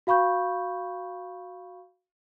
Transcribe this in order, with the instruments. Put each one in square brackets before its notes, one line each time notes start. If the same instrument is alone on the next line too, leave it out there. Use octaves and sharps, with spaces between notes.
[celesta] F#4 F5 B5 C#6 G6